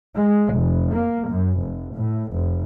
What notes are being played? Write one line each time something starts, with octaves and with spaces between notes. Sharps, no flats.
G#3
F1
A#3
F#2
F1
A2
F1